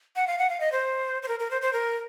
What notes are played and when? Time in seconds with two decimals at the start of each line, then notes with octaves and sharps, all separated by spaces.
0.16 F#5
0.27 F5
0.38 F#5
0.49 F5
0.60 D#5
0.72 C5
1.22 C5
1.28 A#4
1.39 A#4
1.51 C5
1.62 C5
1.73 A#4